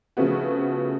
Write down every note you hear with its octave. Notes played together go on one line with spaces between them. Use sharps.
C#3 F3 A3 B3 F#4